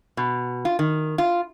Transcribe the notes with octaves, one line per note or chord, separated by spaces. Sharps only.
B2
F4
D#3
F4